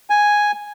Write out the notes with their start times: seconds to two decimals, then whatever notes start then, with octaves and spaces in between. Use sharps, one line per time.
0.10 G#5